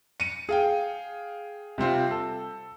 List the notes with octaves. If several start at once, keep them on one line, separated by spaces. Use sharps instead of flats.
C#7 D#7
G#4 F5 G5
C3 G3 C4 F4
A4